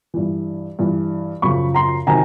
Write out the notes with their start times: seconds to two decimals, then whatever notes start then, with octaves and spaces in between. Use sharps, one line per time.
0.14 G2 E3
0.79 G2 E3
1.42 F#2 C#3 F3 B5 C#6
1.74 A#5 C6
2.07 C3 D#3 F#3 G#5 A#5